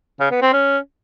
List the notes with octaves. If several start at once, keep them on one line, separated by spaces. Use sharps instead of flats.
C#3
B3
C4
C#4